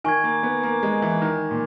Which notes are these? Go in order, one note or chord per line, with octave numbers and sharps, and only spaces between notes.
D#3 G#5 C#6 G#6
A#3
B3
A#3
G#3
E3
D#3
A#2